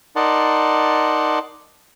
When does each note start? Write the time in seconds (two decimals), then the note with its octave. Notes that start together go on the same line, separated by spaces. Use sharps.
0.16 D#4 A#4 D5 F#5 A5 C6